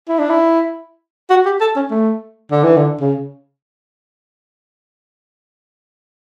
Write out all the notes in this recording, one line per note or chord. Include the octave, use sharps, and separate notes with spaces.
E4
D4
E4
F#4
G4
A4
C#4
A3
D3
E3
D3
C#3